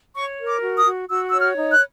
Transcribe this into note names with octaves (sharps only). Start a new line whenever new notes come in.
C#5 C#6
A#4
D6
F#4
D#6
F#4
F#4 E6
C#5 E6
F6
D#4
F#6